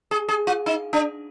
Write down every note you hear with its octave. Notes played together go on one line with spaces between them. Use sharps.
G#4
G#4
F4
D#4
D4